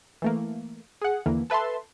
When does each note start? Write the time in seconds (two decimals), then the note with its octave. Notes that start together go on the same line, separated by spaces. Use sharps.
0.22 E3 A3 A#3
1.01 G#4 F#5
1.26 D#2 D3 E3 A#3
1.50 A4 B4 E5 A5 C6